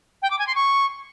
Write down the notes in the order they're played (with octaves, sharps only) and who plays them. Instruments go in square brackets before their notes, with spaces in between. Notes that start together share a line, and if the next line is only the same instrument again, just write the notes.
[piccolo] G5
D6
G#5
C6
C#6